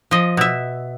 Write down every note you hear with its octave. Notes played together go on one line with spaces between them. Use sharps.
F3 D#5
B2 E5